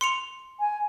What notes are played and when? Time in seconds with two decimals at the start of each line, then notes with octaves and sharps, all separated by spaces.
0.01 C6 C#7 F7
0.60 G#5